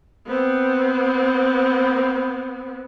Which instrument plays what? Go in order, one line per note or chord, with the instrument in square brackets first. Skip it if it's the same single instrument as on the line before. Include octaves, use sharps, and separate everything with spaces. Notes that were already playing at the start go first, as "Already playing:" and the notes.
[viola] B3 C4